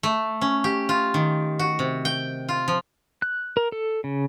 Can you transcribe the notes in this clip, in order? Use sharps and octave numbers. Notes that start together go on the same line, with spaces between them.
A3
C#4
G4
F4
D#3
F#4
C3
G5
F4
F3
F#6
A#4
A4
C#3